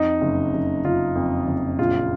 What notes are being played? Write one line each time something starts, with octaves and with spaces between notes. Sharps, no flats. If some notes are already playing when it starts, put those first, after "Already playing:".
Already playing: F2 D#4
F#1
F#1
F#1 F4
F2
F#1
A#1 F4